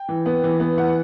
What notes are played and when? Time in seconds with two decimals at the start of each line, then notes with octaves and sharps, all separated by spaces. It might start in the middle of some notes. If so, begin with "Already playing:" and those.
Already playing: G5
0.09 E3
0.26 B3
0.44 E3
0.60 B3
0.77 E3 F#5